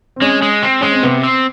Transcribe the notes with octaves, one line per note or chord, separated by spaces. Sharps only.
C4
G#3 C#4
G#3
C4
G#3 C#4
C4
C3 B3
C4